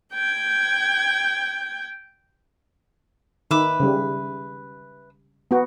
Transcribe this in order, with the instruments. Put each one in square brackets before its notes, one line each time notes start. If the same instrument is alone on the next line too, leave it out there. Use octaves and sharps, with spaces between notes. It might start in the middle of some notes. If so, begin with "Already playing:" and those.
[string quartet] G5 G6 G#6
[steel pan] D#3 [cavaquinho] B4 E5 D6
[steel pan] C#3 G3
B3 F#4